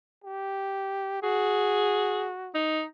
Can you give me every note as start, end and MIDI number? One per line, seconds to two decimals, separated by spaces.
0.24 1.19 67
1.23 2.54 66
1.23 2.27 68
2.55 2.84 63